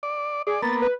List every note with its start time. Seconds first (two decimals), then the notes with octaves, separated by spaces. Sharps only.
0.03 D5
0.47 G#4 D5
0.62 A#3 B3 A6
0.82 B4